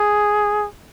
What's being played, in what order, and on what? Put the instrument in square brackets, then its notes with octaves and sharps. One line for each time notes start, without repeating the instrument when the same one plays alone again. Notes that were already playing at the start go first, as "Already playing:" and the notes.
Already playing: [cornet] G#4